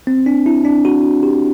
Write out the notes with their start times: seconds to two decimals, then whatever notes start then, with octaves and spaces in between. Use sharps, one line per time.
0.07 C4
0.26 D4
0.46 E4
0.65 D4
0.85 F#4
1.23 G4